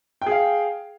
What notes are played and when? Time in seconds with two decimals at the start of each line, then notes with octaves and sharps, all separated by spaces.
0.22 G5
0.26 G#4
0.31 F5